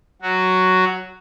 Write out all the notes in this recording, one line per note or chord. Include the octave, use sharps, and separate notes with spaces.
F#3 F#4